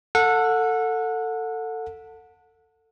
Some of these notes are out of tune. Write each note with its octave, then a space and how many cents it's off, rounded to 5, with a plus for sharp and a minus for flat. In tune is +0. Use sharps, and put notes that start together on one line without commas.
A4 +20 F#5 -25